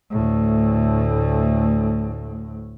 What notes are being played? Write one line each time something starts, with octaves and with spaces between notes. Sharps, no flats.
D2 A2